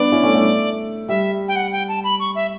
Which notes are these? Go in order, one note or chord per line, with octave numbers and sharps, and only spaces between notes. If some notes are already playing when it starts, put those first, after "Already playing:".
Already playing: B3 D4 D5
C#4 E4
A3 C#4
A3
G3 E5
G5
F#5
G5
A5
B5
C#6
E5